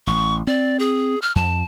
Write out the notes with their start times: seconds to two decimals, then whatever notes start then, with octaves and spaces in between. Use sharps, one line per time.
0.07 A1 C#6
0.47 C4 D5
0.79 G#4
1.22 F6
1.36 F2 A5